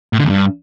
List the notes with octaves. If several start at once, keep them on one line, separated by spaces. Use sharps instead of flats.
A2
D3
E2
G2